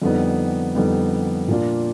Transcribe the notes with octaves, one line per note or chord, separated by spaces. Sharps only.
F2 D3 G3 B3 D#4
F2 D3 G3 B3 D#4
A#2 F3 A#3 D4 F4